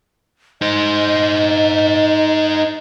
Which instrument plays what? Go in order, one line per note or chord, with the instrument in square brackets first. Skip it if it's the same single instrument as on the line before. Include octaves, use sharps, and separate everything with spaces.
[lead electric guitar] D#4 C5 [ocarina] D#5